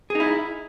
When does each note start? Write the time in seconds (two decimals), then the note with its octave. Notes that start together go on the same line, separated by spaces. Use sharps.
0.10 G#4
0.15 D#4
0.20 E4